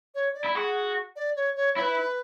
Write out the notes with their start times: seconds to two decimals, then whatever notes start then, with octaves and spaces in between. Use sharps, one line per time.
0.15 C#5
0.35 D5
0.44 E4
0.55 F#4 G#4
1.16 D5
1.36 C#5
1.56 C#5
1.76 E4 B4 C#5